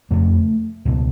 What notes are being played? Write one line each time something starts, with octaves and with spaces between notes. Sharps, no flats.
F2 C#3 A3
C#2 B2